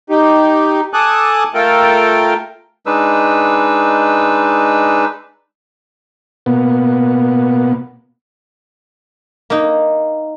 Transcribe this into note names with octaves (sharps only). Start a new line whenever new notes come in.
D#4 G4
A4 G#5 A5 D6 D#6 F#6
A3 F4 A4 A#4 G5
G#3 D4 D#4 B4 E6
B2 A#3 B3
A#3 D#4